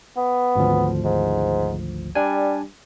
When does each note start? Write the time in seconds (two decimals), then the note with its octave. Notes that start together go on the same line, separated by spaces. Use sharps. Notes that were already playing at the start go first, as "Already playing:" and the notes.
0.17 B3
0.56 G#1 D2 F3
1.04 G#2
2.15 G3 D4 G#5